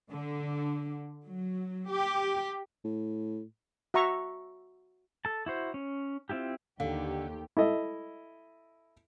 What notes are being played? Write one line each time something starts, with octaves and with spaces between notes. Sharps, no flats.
D3
F#3
G4
A2
F#4 E5 A#5 C#6
A4 A5
E4 F#4 C5
C#4
C4 E4 F4 G4
D#2 D3 G4 F5
E4 A4 D#5